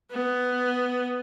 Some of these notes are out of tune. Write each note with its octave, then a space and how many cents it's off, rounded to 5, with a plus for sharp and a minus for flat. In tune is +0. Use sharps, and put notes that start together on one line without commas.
B3 +10